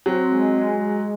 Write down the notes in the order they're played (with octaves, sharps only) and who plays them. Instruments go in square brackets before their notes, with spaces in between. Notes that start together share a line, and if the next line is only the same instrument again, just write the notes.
[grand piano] F#3 [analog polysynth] C4
[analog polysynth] G#3
G#3